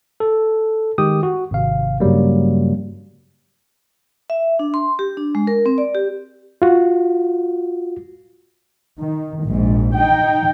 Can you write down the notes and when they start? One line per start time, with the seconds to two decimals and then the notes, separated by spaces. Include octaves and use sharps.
0.20 A4
0.98 D#3 G#3 G4 G5 D#6
1.23 F#4
1.51 G#1 C3 F5
2.00 G2 C#3 F#3 G3 A#3
4.30 E5
4.59 D4
4.74 C6
4.99 G4
5.17 D4
5.35 G#3
5.47 A#4
5.66 C4
5.78 D5
5.95 G4
6.62 F4 F#4
8.98 D#3
9.45 A#1 G#2
9.95 D#4 G5